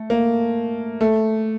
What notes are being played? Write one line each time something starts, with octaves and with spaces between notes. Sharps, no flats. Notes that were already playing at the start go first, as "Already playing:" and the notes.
Already playing: A3
A#3
A3